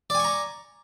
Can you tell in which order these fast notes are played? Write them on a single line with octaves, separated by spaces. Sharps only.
D5 G#5 C#6 A#5